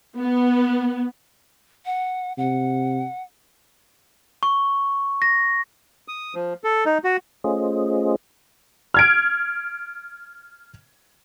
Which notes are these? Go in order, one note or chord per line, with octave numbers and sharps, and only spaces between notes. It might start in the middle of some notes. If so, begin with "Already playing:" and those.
B3
F#5
C3 F#5
C#6
A#6
D#6
F3
A4
D#4
F#4
A3 C#4 F4 G#4 C5 D#5
F6 G#6 D7